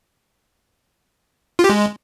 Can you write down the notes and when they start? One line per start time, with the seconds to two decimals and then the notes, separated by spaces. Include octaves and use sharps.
1.59 F4
1.64 G4
1.69 G#3